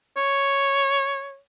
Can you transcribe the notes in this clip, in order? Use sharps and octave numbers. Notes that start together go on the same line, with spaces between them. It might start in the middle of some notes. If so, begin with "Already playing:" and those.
C#5